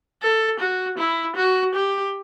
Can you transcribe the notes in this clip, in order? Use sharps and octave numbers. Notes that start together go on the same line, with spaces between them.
A4
F#4
E4
F#4
G4